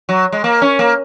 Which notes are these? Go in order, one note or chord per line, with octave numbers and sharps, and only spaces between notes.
F#3
G#3
A#3
C#4
A#3